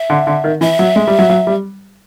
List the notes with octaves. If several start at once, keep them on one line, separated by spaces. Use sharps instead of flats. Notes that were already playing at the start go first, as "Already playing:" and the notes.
Already playing: E5
D3
D3
D#3
E3 E5
F#3
G#3
G3
F#3
F#3
G3